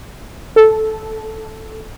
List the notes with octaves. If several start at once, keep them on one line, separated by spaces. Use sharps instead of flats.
A4